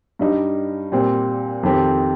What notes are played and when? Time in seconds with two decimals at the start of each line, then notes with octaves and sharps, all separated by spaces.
0.19 G2 G3 D#4
0.92 A#2 G3 C4
1.63 F2 D#3 C4 G4